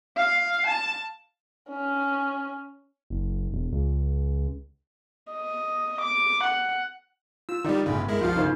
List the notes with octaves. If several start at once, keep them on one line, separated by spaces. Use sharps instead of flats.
F5
A5
C#4
F#1
E1
C#2
D#5
D6
F#5
F4 E6
D#3 G3 D#4 D5
G1 A2 C#3
F#1 G#3 E4 A#4
C2 F3 F4 F#4 F5
G1 C#3 D#4 A#4 C5